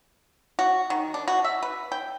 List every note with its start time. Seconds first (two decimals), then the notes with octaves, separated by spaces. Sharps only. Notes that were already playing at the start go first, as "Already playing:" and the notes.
0.59 F#4
0.90 D#3
1.14 D4
1.28 F#4
1.44 E5
1.63 B4
1.92 G5